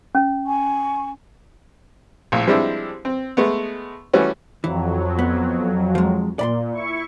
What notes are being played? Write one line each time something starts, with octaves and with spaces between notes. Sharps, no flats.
C#4
G#5 C#6
A#1 A2
F3 G3 G#3 C4 D4 E4
C4
G#3 A3 B3
E3 G3 A3 C#4 F#4
F2 E3 F#3
B3
F3 G#3
A#2 D5 B5 C6
E4 C#6